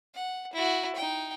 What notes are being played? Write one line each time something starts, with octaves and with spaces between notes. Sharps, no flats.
F#5
E4 F#4
D#4 G5